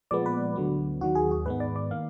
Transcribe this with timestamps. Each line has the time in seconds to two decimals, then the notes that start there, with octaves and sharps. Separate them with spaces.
0.11 A#2 F3 G#3 B3 D5
0.26 B4
0.56 D2 D3 F#3 B3
1.01 D#2 D#3 F#3 F#4
1.15 G#4
1.31 F#4
1.45 G#2 D#3 G#3 B3 B4
1.60 D5
1.76 D5
1.91 D#3 A#3 F5